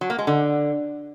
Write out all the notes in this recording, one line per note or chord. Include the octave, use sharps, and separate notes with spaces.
F#3
A#3
G#3
D3